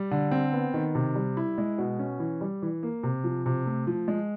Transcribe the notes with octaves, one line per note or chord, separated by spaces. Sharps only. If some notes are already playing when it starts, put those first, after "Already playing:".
Already playing: G3
D3
C4
B3
D#3
C3
G3
E4
G#3
B2
C#4
E3
G3
E3
A#3
C3
F3
C3
A3
F3
G#3